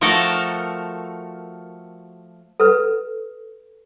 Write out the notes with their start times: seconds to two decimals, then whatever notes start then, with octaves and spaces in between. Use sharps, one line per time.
0.01 F3 A3 F#4 A4 A#4
2.60 A4 B4